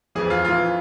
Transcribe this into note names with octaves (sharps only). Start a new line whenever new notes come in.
F2 E3 G#4
F4
F2 E3 F4